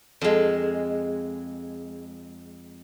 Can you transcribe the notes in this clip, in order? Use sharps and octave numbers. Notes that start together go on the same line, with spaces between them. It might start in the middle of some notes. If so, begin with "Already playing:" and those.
F2 G#3